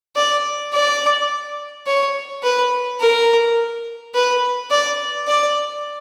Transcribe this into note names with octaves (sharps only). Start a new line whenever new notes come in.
D5
D5
C#5
B4
A#4
B4
D5
D5